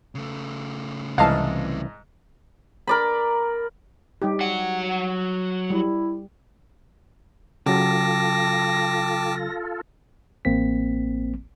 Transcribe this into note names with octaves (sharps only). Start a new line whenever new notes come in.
C#3 A3
C2 G#2 E3 D#5 F5 A5
A#4 D5 B5
G3 D#4 G4
F#3 F#5
G3 E4
C#3 F#3 F4 A4 G5 A5 D6 A#6
A1 A#3 C4 B6